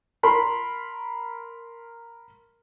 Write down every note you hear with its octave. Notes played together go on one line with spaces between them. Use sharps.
A#4 B5 C6